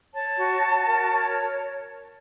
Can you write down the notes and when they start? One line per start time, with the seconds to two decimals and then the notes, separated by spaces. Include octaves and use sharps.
0.13 C#5 A5
0.37 F#4
0.62 F#4
0.86 A#4
1.10 C#5